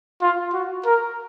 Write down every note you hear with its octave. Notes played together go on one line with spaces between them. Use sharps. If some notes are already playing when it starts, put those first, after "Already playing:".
F4
F#4
A#4